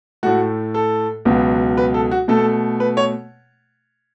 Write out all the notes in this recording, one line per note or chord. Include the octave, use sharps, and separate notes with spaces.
A2 A3 F#4
A4
C#2 B2 F#3 B3
B4
A4
F#4
B2 A3 A4
B4
C#5